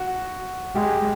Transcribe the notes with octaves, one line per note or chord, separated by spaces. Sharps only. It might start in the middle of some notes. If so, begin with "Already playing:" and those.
Already playing: F#4
G#3 G4